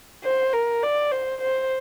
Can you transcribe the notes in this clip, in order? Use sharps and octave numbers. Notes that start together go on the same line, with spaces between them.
C5
A#4
D5
C5
C5